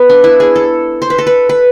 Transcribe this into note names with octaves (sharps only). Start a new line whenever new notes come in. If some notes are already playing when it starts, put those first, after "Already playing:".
Already playing: B3
D4
E4
G#4
A4
C5
B4
A4
B4
B4